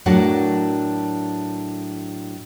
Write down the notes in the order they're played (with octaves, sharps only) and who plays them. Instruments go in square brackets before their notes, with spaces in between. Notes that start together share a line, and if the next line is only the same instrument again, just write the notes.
[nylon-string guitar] A2 F#3 D4 F#4 A#4 F#5